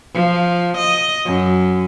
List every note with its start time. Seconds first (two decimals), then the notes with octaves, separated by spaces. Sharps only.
0.14 F3
0.78 D#5
1.25 F#2